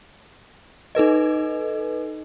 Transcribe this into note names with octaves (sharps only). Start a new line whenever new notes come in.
D#4 A4 B4 D#5